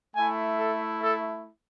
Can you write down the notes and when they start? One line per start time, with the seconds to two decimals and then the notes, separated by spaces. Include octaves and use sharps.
0.15 A3 E4 G#5
0.57 A4
1.00 A4